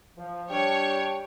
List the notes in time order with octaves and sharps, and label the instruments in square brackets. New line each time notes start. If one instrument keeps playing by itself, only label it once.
[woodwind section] F3
[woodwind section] G3 D4 G5 [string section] C#5